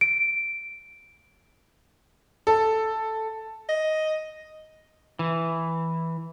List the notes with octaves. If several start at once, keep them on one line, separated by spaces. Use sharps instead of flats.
D7
A4
D#5
E3